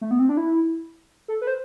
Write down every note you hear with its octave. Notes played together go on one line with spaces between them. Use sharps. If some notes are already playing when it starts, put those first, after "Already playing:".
A3
B3
C4
D4
E4
A4
B4
C5